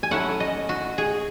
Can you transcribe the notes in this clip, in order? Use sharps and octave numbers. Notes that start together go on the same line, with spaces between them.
G#5
F#3 A3 C#4 E4 F#5
D#5
F#4
G#4